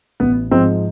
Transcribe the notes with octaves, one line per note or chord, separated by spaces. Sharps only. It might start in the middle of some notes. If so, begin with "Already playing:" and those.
A1 B3
G#2 F3 C4